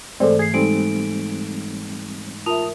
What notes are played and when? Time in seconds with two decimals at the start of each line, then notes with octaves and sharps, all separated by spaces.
0.20 G#2 E3 G#3 A3 C4 A4 C5 D5
0.39 G#4 G#6 C7
0.54 G3 G#3 C4 D#4 A4 D7
2.46 F4 A#4 E5 A5 D#6 F7